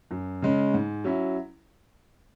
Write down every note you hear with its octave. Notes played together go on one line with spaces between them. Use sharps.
F#2
C#3 G#3 C#4
G#2
F#3 C#4 E4